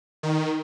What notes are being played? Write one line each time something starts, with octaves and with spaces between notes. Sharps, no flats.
D#3